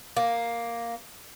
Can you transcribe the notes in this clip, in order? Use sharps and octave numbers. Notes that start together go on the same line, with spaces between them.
A#3